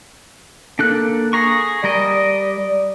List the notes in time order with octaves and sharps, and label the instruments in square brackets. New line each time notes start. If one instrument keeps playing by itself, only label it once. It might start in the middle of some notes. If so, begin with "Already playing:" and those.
[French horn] A#3 [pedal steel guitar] D4 A4 F#6
[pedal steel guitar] G#4 A#5 C#6
[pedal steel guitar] G3 A#4 D#5 [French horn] D5